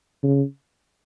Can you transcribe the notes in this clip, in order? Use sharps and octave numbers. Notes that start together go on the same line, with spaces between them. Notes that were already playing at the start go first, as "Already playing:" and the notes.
C#3